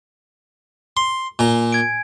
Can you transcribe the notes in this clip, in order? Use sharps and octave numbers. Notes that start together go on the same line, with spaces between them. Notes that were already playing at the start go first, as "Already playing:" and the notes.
C6
A#2 G#5 A#5
G#6 D7